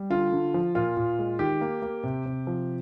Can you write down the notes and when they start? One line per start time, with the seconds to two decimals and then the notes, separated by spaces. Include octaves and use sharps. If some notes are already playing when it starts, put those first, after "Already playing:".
Already playing: G3
0.10 D3 F4
0.32 D3
0.54 F3
0.75 A#2 F4
0.97 A#2
1.19 G#3
1.39 D#3 G4
1.61 A#3
1.82 A#3
2.03 C3
2.26 C3
2.47 F3